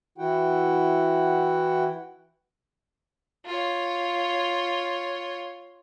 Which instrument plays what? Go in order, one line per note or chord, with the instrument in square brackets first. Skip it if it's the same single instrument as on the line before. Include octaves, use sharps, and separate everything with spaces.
[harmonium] E3 E4 F#4 F#5 G5
[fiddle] F4 C#5